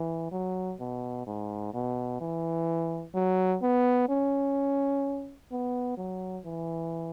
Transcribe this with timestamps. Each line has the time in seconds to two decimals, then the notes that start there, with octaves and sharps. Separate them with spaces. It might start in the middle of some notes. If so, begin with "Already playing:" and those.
Already playing: E3
0.32 F#3
0.80 B2
1.26 G#2
1.74 B2
2.21 E3
3.14 F#3
3.62 B3
4.09 C#4
5.51 B3
5.97 F#3
6.45 E3